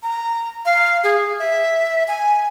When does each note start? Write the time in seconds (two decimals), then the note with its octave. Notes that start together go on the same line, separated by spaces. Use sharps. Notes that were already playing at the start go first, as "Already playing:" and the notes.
0.03 A#5
0.65 F5
1.04 G#4
1.39 E5
2.08 G#5